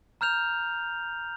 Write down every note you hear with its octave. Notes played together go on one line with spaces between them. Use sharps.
A#5 F6 G6 F7